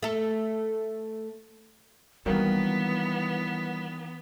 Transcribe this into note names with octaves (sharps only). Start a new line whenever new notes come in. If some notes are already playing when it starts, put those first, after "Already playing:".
A3 A4
D#3 E3 F#3 G3 A#3 B3 D4